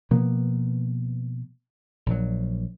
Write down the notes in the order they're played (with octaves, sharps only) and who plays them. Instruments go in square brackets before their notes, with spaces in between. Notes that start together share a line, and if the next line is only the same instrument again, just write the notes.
[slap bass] B2 F3 A#3 B3
A#1 F#3